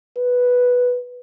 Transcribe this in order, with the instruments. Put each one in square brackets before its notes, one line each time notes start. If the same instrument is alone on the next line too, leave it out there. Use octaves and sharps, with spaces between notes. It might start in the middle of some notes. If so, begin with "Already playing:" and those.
[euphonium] B4